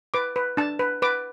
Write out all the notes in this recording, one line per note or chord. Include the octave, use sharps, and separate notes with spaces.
B4 D6
B4
D4 A5
B4
B4 D6